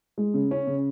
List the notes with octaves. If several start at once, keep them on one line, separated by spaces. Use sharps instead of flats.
G#3
C#3
C#4
C#3